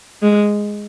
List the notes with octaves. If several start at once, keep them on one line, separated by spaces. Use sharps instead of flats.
G#3